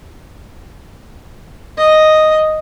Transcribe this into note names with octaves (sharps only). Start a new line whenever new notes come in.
D#5